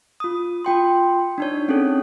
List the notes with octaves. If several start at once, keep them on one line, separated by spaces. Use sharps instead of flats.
F4 D#6
F4 G5 C6
D4 D#4 C#5
C4 C#4 D#4 G#4 A4 C#5